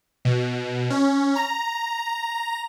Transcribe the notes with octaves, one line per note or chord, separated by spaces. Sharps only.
B2
C#4
A#5